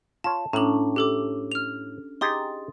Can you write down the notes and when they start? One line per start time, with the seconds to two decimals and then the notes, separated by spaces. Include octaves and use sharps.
0.24 F4 C#5 A5
0.53 A2 C#4 D4 A#5 F#7
0.96 G4 A4 D6
1.52 F6 F7
2.21 D#4 G4 G#4 C6 D#6 A6